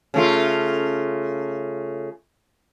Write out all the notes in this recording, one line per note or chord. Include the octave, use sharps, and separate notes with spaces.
C#3 A3 F4